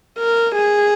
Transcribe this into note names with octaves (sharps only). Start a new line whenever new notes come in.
A#4
G#4